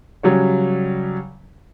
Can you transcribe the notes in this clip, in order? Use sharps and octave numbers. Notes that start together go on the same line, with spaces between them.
C#3 F#3 G3 C#5